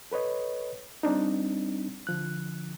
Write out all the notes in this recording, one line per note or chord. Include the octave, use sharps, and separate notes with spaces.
A4 B4 C#5 D#5
G3 C4 D4 D#4
D3 F3 F#6